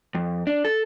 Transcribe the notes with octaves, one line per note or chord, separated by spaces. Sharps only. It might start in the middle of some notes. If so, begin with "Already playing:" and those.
F2
D4
A4